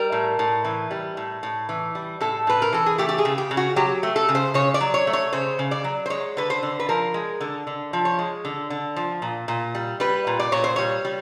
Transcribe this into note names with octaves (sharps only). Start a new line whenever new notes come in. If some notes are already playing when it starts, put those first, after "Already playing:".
Already playing: G3 A#4
A2
A2
E3
G3
A2
A2
E3
G3
A2 A4
A2 B4
A#4
E3 A4
G#4
A3 G4
G4
G#4
C#3
G4
C#3
F#4
F#3 G4
A3
A4
C#3
C5
C#3 C#5
D5
F#3
C#5
A3
C#5
C#3 C5
C#3
D5
F#3
C5
G#3 C#5
D3 B4
C5
D3
B4
F3 A#4
G#3
D3
D3
F3
C#5
G#3
D3
D3
F3
A#2
A#2
G3
G3 B4
A#2
D5
A#2 C#5
C5
G3 C#5
G3